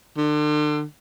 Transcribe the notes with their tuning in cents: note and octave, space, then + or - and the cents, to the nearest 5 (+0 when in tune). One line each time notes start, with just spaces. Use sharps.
D3 +35